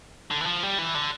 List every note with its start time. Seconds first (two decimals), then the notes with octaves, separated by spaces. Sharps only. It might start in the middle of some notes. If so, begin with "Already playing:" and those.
0.31 D3
0.41 E3
0.46 F3
0.63 G3
0.79 E3
0.95 D3